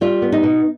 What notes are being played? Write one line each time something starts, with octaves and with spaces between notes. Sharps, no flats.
G3 F4
B3
D#4
B2